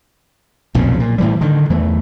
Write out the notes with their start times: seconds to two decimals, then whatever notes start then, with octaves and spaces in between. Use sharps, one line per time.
0.74 B1 F2 A#2 C#3
1.00 A#2
1.18 A2 E3 G3
1.41 D3 D#3
1.70 E2 E3 A3